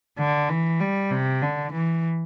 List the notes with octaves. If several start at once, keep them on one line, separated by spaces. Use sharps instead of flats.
D3
E3
G3
C3
D3
E3